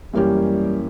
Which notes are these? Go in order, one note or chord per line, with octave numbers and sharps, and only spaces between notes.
F#2 E3 G3 A#3 C#4 G4